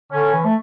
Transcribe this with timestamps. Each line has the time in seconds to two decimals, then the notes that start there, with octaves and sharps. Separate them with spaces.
0.12 D3 C#4
0.33 E3
0.45 A3